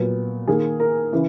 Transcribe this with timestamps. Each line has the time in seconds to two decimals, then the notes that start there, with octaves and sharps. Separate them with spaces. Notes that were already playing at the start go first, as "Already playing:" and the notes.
Already playing: A#2 F#3 B3
0.48 D#3 A#3 G#4
0.80 A#4
1.12 C#3 E3